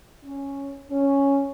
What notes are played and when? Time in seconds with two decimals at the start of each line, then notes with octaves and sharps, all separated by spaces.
0.24 C#4
0.90 C#4